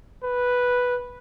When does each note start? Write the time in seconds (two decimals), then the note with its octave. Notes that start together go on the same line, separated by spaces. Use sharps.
0.24 B4